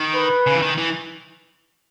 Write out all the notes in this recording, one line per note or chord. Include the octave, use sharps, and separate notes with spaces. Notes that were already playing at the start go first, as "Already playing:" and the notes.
Already playing: D#3
B4
C#3
E3
D#3
E3